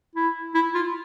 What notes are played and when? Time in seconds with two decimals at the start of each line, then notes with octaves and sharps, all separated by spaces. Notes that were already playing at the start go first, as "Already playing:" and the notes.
0.15 E4
0.55 E4
0.75 F4